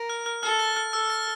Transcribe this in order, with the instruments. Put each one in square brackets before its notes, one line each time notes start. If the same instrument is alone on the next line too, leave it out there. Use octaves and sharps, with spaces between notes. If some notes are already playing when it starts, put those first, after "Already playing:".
Already playing: [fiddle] A#4
[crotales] F6
F6
[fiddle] A4 [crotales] F6
[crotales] A6
F6
[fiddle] A4 [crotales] E6
[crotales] A6